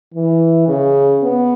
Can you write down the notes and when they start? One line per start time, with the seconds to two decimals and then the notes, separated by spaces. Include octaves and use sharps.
0.14 E3
0.68 C#3
1.23 B3